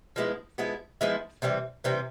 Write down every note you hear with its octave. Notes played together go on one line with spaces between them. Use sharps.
F3 G#3 B3 E4
F3 G#3 B3 E4
F3 G#3 B3 E4
C3 E3 G3 C4
C3 E3 G3 C4